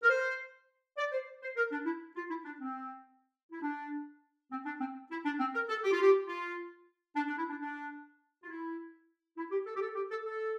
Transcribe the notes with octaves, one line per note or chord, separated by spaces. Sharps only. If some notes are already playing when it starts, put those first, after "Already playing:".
A#4
C5
D5
C5
C5
A#4
D4
E4
F4
E4
D4
C4
E4
D4
C4
D4
C4
E4
D4
C4
A#4
A4
G4
F4
G4
F4
D4
D4
E4
D4
D4
F4
E4
E4
G4
A4
G4
A4
G4
A4
A4